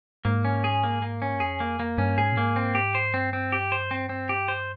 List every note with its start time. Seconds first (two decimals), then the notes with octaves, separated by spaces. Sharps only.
0.25 G#2 A#3
0.45 C#4
0.64 G#4
0.83 A#3
1.02 A#3
1.22 C#4
1.35 G2
1.40 F2 G#4
1.60 A#3
1.80 A#3
1.98 G2 C#4
2.18 G#2 G#4
2.32 A#2
2.36 G#2 A#3
2.56 C4
2.75 G4
2.95 C5
3.13 G2 C4
3.33 C4
3.52 G4
3.72 C5
3.91 C4
4.09 C4
4.29 G4
4.48 C5